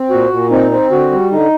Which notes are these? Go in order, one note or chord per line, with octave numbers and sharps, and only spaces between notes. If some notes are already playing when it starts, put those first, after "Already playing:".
Already playing: C4
A#2 F#4
A#2
C4 D#4
C4
D3 F#4
G3
D3 D#4